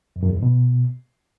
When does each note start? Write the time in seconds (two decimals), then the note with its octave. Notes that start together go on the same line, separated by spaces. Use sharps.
0.16 F2
0.23 F#2
0.29 E2
0.36 G#2
0.43 B2